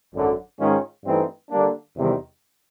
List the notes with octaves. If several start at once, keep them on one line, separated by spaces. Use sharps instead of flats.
G#1 F#2 D3
G#2 D#3 G#3 C#4 F4
G2 E3 A3 C4 D#4
D3 G3 A#3 D4
E2 C3 D#3 G3